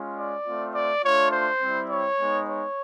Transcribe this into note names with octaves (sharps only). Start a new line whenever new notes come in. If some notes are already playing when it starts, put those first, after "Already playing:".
Already playing: G#3 C#4 F4
D5
A3 C4 F4
D5
A3 D4 F4 C#5
C5
G3 C4 E4
C#5
G#3 B3 D#4
C#5